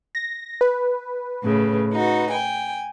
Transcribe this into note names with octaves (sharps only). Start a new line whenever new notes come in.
A#6
B4
A2 C#3
D#4 F#4
G5 G#5